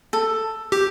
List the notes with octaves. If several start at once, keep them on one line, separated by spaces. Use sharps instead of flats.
A4
G4 G5